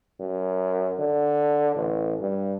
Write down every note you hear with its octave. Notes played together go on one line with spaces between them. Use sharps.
F#2
D3
A1
G2